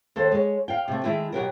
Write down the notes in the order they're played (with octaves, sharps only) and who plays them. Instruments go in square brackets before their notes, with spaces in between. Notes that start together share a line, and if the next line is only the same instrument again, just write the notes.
[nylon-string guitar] D#2 A4 C5
G#3 C#5
F5 G5
C3 A3
D#3 G#3 A3 E4
B2 F#3 G4 A#4